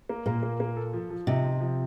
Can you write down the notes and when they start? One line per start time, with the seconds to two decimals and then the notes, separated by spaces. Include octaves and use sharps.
0.09 A#3
0.26 A#2 A#3
0.43 A#3
0.60 A#3
0.77 A4
0.93 F3
1.10 F3
1.27 C3 D#4
1.44 C4
1.61 F3